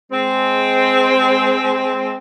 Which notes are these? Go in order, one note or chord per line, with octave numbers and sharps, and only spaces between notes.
G#3 C4